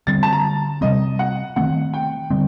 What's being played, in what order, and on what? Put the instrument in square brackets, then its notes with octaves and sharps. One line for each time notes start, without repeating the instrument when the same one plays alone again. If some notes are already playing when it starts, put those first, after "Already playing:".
[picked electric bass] D3 G3 C4 [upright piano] A6
[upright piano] A5
A#5
[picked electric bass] C3 G3 C4 [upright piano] D#5
[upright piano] F#5
[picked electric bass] D#3 A3 C4 [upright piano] F#5
[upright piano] G5
[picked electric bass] D3 G3 C4